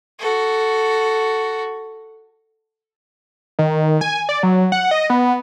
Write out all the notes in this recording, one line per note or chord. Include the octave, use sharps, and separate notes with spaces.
F#4 A4
D#3
G#5
D5
F#3
F#5
D#5
B3